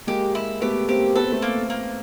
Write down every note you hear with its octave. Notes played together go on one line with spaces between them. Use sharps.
G#3 A#3 G4
E4
A3 B3 G4
A#3 C4 G4
B3 A4
C4
A3 B3
A#3
A#3